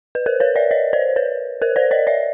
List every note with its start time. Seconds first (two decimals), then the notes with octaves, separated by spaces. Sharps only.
0.15 B4
0.26 A#4 C5
0.40 B4 C#5
0.56 D5 E5
0.71 C#5 D#5
0.93 C5 D5
1.16 B4 C#5
1.62 A#4 C5
1.76 C5 D5
1.91 C#5 D#5
2.07 D5 E5